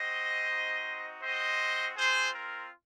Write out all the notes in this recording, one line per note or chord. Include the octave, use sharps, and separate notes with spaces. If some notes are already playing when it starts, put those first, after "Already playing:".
Already playing: C4 F#4 C5 D#5
C4 D#4 F#4
C4 F#4 C5 D#5
C4 F4 G#4 C5
A#4